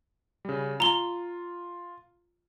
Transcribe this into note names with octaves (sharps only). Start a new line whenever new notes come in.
C#3 G3
F4 A#5 G7